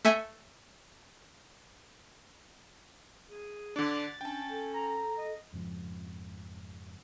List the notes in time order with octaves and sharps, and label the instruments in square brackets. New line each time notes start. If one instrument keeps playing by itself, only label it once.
[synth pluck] A3 E5 G#5 C#7
[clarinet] G#4
[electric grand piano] D3 D4 [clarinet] D6 [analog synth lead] A6
[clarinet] C#4 [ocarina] D4 [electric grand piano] G5 A5
[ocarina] A4
[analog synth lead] A#5
[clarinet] D#5
[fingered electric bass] F2 G#2 C#3 F3